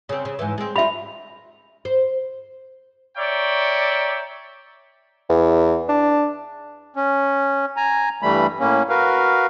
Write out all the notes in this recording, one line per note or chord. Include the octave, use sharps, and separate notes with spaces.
C#3 C4
C#3
G#2 E3
G#3 C4
G3 F4 E5 B5
C5
C#5 D5 E5 G5 A#5
E2
D4
C#4
G#5 A#5
G2 E3 G3 A3 B5
A2 A#3 C#4
F#4 A#4 B4 F5